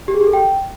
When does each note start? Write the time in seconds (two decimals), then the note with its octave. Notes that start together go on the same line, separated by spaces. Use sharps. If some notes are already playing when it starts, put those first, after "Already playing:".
0.08 G4
0.14 G#4
0.21 G4
0.27 A4
0.33 G5